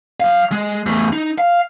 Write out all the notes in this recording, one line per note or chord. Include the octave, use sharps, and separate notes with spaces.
F#3 F5
G#3
E2 A3
D#4
F5